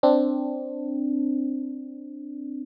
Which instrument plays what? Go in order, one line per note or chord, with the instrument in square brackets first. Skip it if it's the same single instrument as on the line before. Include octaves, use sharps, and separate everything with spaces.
[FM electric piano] C4 D4